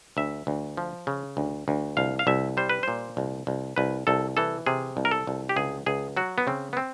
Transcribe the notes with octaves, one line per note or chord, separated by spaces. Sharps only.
D2 E5
D2
F3
C#3
D2
D2
C2 F5
F5
C2 E5
G3 C5
B4
A#2 C5
C2
C2
C2 B4
C2 A4
E3 A4
C3 G#4
C2
A#4
A4
C2
G4
C#2 G#4
C#2 G#4
F#3 F#4
B3
C#3 C4
B3
C4